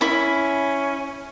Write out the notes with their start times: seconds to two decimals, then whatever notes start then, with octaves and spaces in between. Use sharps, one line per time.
0.01 C#4 E4 B5